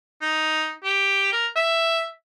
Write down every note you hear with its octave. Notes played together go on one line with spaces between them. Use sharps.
D#4
G4
A#4
E5